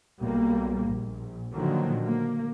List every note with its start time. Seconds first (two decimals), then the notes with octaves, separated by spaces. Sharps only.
0.22 B1 G3 A#3
0.87 A#1
1.54 A#2 D3 D#3 F3 F#3 A#3
2.01 A#3